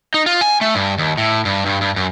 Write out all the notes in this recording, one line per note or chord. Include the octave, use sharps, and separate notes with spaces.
D#4
F4
G#5
A3
G2
D#2
A2
G2
G2
G2
F#2